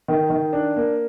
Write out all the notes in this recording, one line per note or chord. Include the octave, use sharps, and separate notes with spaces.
D#3
D#3
D4
A#3